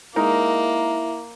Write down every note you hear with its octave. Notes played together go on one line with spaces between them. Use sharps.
G#3 A#3 D#4 E4 A#4